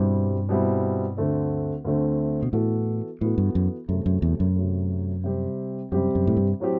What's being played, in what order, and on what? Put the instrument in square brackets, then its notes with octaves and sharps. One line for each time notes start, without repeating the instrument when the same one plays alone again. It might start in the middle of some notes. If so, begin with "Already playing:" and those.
Already playing: [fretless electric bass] G2 [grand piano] B2 G3 C4 E4
[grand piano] B2 G3 C4 E4
D2 D3 A3 C4
D2 D3 A3 C4
[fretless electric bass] B2
[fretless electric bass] A2 [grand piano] E3 B3 F#4 A4
[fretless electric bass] A2 [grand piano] E3 B3 F#4 A4
[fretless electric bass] G2
F#2
[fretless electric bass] F#2 [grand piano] C3 F#3 A3
[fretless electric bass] F#2
E2
F#2
[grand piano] C3 F#3 A3
C3 G3 C4 G4
[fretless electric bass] F#2 [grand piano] C3 G3 C4 G4
[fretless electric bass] F#2
A2
G2
[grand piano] A2 F#3 C4 G4